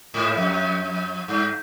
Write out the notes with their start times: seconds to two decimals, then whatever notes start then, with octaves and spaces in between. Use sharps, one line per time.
0.14 G#2
0.37 F2
1.28 G2